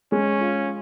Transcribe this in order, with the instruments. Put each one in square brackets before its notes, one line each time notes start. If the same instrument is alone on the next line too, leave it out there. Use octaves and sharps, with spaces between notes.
[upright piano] G#3 [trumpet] C#4
[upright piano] F4